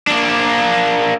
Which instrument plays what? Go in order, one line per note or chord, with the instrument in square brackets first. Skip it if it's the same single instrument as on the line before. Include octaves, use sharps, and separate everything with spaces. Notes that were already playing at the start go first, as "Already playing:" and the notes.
[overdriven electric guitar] A#3 D4